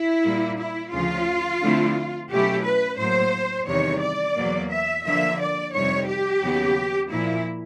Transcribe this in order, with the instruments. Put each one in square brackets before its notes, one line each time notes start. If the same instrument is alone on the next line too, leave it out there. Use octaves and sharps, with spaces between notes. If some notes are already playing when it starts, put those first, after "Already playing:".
Already playing: [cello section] E4
A#2 G3 A#3
E4
D2 C#3 F3 F4
D3 F3 A3 C4 E4
B2 F#3 A3 C#4 E4 G4
B4
A2 F#3 A#3 C5
E2 C3 D#3 G3 C#5
D5
E2 B2 F#3 A#3
E5
D3 F3 A#3 E5
D5
F2 C3 D#3 G3 C#5
G4
D#2 C#3 F#3 B3
A#2 F3 A#3 E4